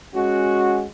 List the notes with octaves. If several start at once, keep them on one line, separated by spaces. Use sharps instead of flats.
G#3 C#4 F#4